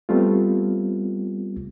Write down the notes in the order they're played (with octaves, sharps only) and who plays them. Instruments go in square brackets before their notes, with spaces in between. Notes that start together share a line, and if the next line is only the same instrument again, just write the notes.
[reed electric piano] G3 A3 B3 C4 F4